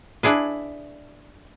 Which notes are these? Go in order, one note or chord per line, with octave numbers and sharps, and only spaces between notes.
D4 E4 G#4 B4